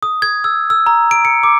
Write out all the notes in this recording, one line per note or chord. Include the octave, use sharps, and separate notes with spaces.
D#6
G#6
E6
E6
A#5
D7
C#7
D6